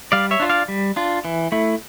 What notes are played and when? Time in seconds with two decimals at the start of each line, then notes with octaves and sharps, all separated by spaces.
0.12 G3 D5 F5
0.31 C#5 E5
0.40 D4 F4
0.49 D5 F5
0.68 G3
0.96 D4 F4
1.25 E3
1.52 A3 E4